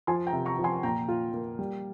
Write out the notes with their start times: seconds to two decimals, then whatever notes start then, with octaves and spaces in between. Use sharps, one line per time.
0.07 F3 G#5 C6
0.27 G5 A#5
0.33 C3
0.46 A#5 C#6
0.59 F3
0.64 G#5 C6
0.83 A#2 G5 A#5
1.08 F4
1.34 A#3
1.59 G3